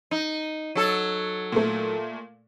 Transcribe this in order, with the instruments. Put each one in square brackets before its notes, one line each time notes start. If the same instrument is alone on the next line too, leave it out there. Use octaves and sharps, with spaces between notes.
[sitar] D#4
F#3 A4
[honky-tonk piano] A#2 A3